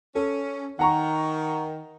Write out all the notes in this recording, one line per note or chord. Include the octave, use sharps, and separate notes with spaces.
C#4 A4
D#3 F#5 A#5 C#6